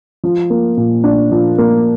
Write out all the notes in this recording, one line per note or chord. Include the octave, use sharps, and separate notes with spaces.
F3
A#3
A#2
D4
F3
A#3